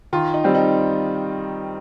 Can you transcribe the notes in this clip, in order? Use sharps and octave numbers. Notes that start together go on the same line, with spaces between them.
D#3 F4
D#4
G3 C4
D#4